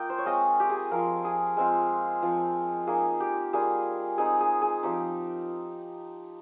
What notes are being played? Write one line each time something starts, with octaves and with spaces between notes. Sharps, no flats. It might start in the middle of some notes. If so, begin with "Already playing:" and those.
Already playing: A#3 F4 D#5 F5 G5
C5
C#5
G#3 C4 F4 D#5
G4
G#4
F3 C4 F4 A#4
G#4
G#3 C4 F4
F3 C4 F4
A#3 D#4 G#4
G4
G3 A#3 F4 G#4
G#3 C4 D#4 G#4
G#4
G#4
F3 C4 D#4 G4